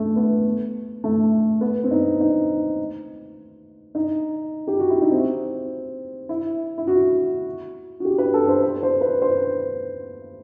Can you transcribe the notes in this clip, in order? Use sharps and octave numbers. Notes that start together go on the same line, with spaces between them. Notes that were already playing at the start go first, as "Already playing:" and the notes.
Already playing: A3
B3
A3
B3
C4
D#4
D#4
D#4
G4
F#4
E4
D#4
C4
E4
E4
F#4
F#4
G4
B4
A4
C5
B4
C5
B4
C5